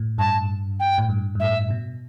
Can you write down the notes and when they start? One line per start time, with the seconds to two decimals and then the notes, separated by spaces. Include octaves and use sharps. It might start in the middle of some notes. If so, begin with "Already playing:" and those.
Already playing: A2
0.18 G2 A5
0.80 G5
0.98 A2
1.09 G2
1.35 G2
1.40 A2 E5
1.71 B2